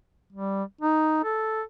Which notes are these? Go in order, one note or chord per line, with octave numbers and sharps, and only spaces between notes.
G3
D#4
A4